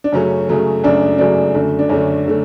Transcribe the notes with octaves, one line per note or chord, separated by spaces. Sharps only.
D4
F#2 C#3 F#3 A3 C#4
F#2 C#3 F#3 A3
F#2 C#3 F#3 A3 D4
F#2 C#3 F#3 A3 D4
F#2 D3 A3
D4
F#2 D3 A3 C#4
D3 A3